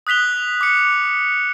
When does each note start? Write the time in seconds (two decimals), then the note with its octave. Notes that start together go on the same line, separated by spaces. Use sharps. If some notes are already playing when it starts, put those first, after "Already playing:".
0.07 D#6 F#6 B6 F7 G7
0.61 D6 C#7